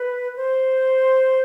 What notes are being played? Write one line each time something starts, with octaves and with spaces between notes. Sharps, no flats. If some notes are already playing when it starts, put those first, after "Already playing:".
Already playing: B4
C5